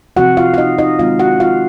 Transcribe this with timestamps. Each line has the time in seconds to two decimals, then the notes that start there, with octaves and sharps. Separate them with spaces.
0.16 C3 F3 C4 F#4 F#5
0.37 F4 F5
0.54 F5
0.58 D#4 D#5
0.78 D#4 D#5
0.99 D#3 G#3 C4 F4 F5
1.19 F#4 F#5
1.40 F4 F5